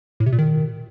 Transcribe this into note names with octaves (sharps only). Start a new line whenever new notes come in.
A2
C3
A#2
D#3